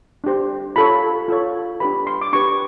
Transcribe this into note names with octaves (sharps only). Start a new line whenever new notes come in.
D4 G4 C5
F4 A4 C#5 B5
F4 A4 C#5
D4 G4 B4 B5
C6
D6
D4 G4 B4 C#6